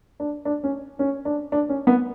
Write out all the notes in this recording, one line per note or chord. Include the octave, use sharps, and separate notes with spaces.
D4
D4
C#4
C#4
D4
D4
C#4
B3